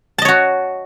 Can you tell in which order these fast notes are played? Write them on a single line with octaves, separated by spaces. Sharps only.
A5 D#5 C#5 F#4